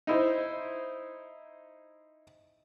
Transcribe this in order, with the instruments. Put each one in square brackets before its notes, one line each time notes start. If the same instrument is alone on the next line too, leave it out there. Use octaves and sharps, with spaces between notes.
[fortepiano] D#4 E4 C5